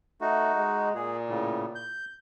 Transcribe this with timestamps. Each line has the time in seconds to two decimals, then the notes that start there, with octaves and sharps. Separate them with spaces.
0.21 A3 D#4 F#4
0.55 G#3
0.95 A#2 G#4
1.28 A2 C#3
1.75 G6